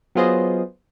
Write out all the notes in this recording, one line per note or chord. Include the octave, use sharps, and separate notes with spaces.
F#3 B3 F4 G#4 C5 D#5